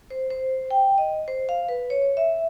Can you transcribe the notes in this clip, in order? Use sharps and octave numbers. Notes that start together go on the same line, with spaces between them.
C5
C5
G5
D#5
C5
F5
B4
C#5
E5